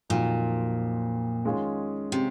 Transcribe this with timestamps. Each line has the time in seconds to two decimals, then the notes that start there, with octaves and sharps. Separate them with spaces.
0.10 F2 A#2 D#3 F#3
1.45 D#3 G#3 C#4 F4 G#4
2.12 C3